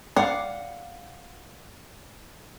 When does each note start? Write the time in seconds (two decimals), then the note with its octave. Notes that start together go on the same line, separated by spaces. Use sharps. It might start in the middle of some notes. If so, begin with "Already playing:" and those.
0.16 D4 F5 F#5